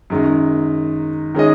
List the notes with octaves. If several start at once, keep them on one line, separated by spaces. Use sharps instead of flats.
F#2 D#3 G#3
D#3 G#3 C#4 G#4 D#5